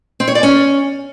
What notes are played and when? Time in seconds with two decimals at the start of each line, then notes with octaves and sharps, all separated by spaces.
0.20 C4
0.28 C#5
0.35 D5
0.43 C#4